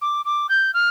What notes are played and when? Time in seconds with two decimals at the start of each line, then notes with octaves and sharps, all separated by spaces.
0.02 D6
0.25 D6
0.49 G6
0.74 F6